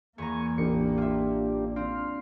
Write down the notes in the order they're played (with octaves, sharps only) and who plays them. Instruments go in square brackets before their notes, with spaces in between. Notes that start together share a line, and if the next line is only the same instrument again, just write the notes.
[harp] E2 A#5 [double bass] A#3 [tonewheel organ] G#5 C#6
[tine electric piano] A1 [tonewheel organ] D4 G4 [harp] C#7
[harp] F4 E5
[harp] C4 [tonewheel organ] D4 F5